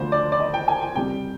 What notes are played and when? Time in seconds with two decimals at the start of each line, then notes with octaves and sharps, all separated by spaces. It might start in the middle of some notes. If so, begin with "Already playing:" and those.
Already playing: D2 D3 F3 C5
0.12 D5
0.32 D5
0.40 D#5
0.54 G5
0.68 G#5
0.82 G5
0.95 F2 C3 G3 G5